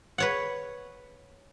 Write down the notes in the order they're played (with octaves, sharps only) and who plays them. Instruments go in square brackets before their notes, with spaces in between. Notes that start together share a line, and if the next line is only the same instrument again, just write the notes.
[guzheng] B4 C#5 F#5